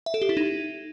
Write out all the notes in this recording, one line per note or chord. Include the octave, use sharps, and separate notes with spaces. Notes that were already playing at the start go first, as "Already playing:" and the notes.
E5
A4
G4
E4
D#4